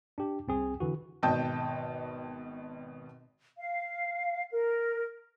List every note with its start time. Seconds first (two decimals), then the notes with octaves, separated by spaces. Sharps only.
0.18 D4 G4
0.48 C2 C4 G#4
0.80 D3 E3 F#4
1.23 G#1 B2 D#5 G5 A5 G6
3.58 F5
4.51 A#4